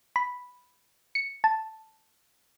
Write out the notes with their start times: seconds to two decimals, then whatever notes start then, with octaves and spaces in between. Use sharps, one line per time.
0.16 B5
1.15 C#7
1.44 A5